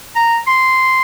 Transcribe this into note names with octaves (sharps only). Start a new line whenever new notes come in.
A#5
C6